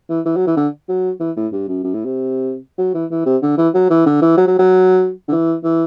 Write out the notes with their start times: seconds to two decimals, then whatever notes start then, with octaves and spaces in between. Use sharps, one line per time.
0.09 E3
0.26 E3
0.36 F#3
0.47 E3
0.57 D3
0.89 F#3
1.20 E3
1.37 A2
1.53 G2
1.68 F#2
1.84 F#2
1.94 A2
2.05 C3
2.78 F#3
2.94 E3
3.11 E3
3.26 C3
3.42 D3
3.58 E3
3.74 F#3
3.90 E3
4.06 D3
4.22 E3
4.37 F#3
4.47 F#3
4.59 F#3
5.28 D3
5.32 E3
5.64 E3